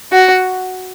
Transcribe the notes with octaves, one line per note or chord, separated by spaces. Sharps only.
F#4